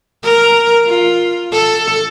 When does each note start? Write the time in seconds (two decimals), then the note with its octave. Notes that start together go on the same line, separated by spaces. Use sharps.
0.23 A#4
0.86 F4
1.52 A4